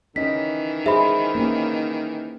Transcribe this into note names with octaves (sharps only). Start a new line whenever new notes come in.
D#3 E3 C#4 D#5 B6
G#4 C5 D#5 E5 B5
A#3 C#4 A#4